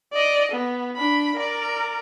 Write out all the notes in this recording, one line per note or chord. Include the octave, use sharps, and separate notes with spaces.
D5 D#5
B3
D4 B5
A#4 D5